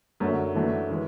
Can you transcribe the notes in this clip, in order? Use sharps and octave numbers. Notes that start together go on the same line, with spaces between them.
F#2 D3 A3 C#4 F#4
E3 A3 D4 F#4
E3 G#3